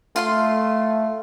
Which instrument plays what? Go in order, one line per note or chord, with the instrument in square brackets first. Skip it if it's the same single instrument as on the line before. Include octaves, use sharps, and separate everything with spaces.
[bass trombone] A3 [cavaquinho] F4 F5 C6